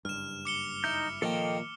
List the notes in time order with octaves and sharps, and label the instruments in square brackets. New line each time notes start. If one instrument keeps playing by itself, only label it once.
[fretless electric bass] F#1 G2 [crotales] F6 E7
[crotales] D6 C#7 G7
[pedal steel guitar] D#4 G6 [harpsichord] E4
[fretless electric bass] A#2 [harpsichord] D#3 F3 A#3 [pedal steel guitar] A4 D#5 G5